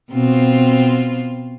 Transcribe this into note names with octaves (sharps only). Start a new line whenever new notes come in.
B2 C4 F4